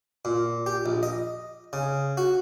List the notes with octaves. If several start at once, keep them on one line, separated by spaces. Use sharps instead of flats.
A#2
G4
A#1
D#5
C#3
F#4